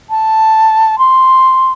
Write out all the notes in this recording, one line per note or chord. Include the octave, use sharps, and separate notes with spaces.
A5
C6